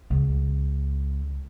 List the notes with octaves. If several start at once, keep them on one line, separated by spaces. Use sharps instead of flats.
C#2